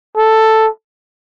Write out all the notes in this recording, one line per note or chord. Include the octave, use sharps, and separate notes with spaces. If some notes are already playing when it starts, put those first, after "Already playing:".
A4